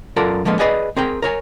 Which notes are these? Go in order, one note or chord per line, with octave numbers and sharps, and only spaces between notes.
F#2 F4 A4 A#4 D5 F#5
D3 F3 G#3 A#3 B3
G#4 B4 D5 D#5 F#5 G#5
C4 G#4 A#4 G5
A#4 C#5 G#5